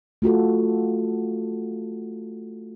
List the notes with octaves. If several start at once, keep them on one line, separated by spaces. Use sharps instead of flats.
A3 F4 F#4 A4